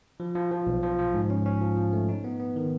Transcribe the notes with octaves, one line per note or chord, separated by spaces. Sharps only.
F3
F3
F3
B1
F3
F3
G#2
C#4
C#4
F3
F3
A3
D#4
B3
B3
D#3